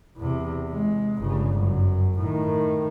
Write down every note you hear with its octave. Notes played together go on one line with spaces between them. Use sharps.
E2 C3
G#3
G1 C#3
F#2
A2 D#3